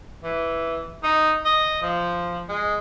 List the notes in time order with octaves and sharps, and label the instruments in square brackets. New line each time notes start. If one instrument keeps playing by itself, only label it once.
[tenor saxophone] E3
D#4
D#5
F3
G#3